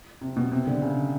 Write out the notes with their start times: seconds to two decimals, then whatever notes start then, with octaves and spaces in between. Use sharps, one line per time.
0.21 C3
0.37 B2
0.51 C3
0.67 D3
0.82 C#3